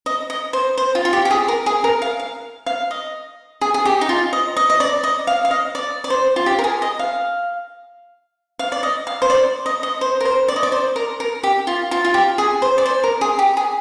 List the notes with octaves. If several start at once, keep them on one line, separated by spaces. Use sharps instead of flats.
D#5
D#5
C5
C5
F4
F4
G4
G4
G#4
A#4
G#4
A#4
F5
F5
F5
D#5
G#4
G#4
G4
D#4
F4
D#5
D#5
D#5
D5
D#5
F5
F5
D#5
D5
D5
C5
F4
G4
A#4
G#4
D#5
F5
F5
D5
D#5
F5
C5
D5
D#5
D#5
C5
A#4
C5
D5
D#5
D5
C5
A#4
A#4
G4
F4
F4
F4
G4
G#4
C5
D5
C5
A#4
G#4
G4
G#4